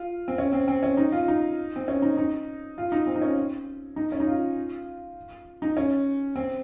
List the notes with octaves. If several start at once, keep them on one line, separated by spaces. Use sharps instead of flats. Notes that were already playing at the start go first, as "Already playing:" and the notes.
Already playing: F4
C4
C#4
C4
C4
C#4
D#4
F4
D#4
C4
C#4
D#4
D#4
F4
D#4
C4
D#4
C#4
D#4
C#4
D#4
F4
D#4
C#4
C4